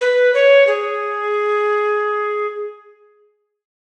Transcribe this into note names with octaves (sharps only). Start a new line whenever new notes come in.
B4
C#5
G#4